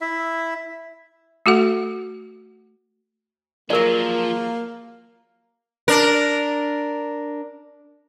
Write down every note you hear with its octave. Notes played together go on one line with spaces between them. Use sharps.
E4 E5
A3 F#4 A4 F#5
F3 F#3 A#3 G#4 A#4 D5
D4 A#4